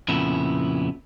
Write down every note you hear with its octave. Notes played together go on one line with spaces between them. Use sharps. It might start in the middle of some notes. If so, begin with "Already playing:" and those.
F2 A#2 C#3 B3 E4